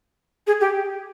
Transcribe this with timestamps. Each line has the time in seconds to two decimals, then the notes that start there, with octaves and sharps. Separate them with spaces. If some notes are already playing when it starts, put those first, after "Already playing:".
0.47 G#4
0.61 G4